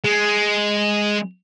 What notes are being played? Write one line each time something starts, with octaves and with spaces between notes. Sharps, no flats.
G#3